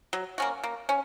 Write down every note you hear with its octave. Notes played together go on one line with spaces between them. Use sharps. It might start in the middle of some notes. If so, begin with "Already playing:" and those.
F#3
A#3 C#4 F#4
A#3
C#4